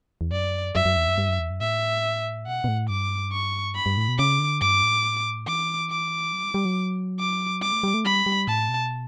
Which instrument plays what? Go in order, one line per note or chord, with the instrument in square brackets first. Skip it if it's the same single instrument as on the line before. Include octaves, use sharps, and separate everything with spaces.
[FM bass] E2
[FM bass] F#2 [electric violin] D5
[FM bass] F#2 [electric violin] E5
[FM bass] F#2
E2
F#2
G2
F#2
E2
F#2
[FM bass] A2 [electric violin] E5
[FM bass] B2 [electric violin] F#5
[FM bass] B2
A2
[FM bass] G2 [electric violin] D6
[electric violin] C#6
B5
[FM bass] G2
A2
B2
[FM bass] C#3 [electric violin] D6
[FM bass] D3
[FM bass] G2 [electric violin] D6
[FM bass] A2
[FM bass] E3 [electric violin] D6
[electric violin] D6
[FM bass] F#3
G3
G3
F#3
[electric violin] D6
[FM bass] G3 [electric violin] D6
[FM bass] A3
G3
A3
[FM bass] G3 [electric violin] B5
[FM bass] G3
[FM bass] A2 [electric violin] A5
[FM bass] B2